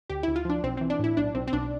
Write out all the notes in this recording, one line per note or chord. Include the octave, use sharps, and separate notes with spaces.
D2 G4
D2 E4
F4
F3 D4
B1 C4
E3 C4
D4
A2 E4
B1 D4
B1 C4
C4
B1 D4